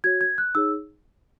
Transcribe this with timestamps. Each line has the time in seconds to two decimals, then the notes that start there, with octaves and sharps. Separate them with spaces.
0.04 F#4 C#5 G#6
0.21 G#6
0.38 F#6
0.55 D#4 G#4 C#5 E6